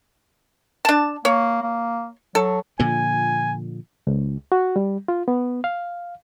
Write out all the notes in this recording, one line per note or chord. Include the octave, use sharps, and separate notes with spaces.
D4 A5
A#3 C#5
A#3
F#3 A4
A#2 D3 F3 G#5
C#2
F#4
G3
F4
B3
F5